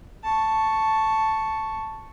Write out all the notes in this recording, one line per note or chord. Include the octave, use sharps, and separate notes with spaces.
A5 C#6